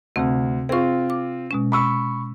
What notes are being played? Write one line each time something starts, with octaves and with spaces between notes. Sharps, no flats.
D2 C3 C4
C4 F4 G#4 C#6
D6
B2 G#3 C#4
B5 C#6 E6